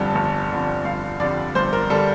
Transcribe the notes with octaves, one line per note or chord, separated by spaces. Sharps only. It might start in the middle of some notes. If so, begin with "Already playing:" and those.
Already playing: G1 F2 D3 G3 A5
G1
F2 D3 G3
G1 F5
F2 D3 G3 D5
G1 C5
A#4
D3 G3 A4